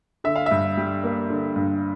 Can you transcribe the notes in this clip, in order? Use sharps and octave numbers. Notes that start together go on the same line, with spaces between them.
D3 E5
F5
G2 E5
G3
A#3
D3
G2